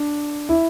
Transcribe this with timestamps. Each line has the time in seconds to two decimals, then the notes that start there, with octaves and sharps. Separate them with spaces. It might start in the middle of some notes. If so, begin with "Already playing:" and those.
Already playing: D4
0.49 E4